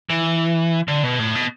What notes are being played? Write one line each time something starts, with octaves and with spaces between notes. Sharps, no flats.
E3
D3
B2
A2
B2